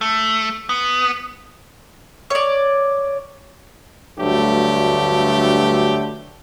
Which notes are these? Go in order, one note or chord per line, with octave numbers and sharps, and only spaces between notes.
A3
B3
C#5 D5
D2 G2 D3 F#3 A3 G4